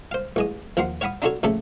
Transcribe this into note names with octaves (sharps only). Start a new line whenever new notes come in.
C5 F5
A1 G#3 D#6
D#2 F3 F4 F#5 C6
C#5 F5 F#5 B5 D#6
D4 D#4 F4 F#4 A4 C#5
A#1 C#3 A3 A4 A5